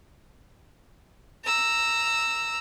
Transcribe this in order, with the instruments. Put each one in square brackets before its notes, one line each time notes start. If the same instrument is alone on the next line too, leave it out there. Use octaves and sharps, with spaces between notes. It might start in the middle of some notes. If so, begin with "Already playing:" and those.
[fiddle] A#5 E6